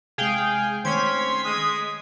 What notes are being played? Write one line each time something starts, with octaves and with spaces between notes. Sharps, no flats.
C3 G#3 G#4 F5 G5
D#3 A3 C4 C#4 C6 G#6 B6
G#3 D#6